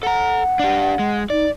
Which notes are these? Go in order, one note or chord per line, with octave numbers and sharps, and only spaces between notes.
A4 F#5 A#5
D4 G4
G#3
D#4 D5